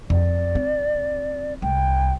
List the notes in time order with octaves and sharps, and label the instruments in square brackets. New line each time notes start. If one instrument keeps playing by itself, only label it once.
[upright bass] F2 [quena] D5
[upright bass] C4
[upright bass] C2 [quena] G5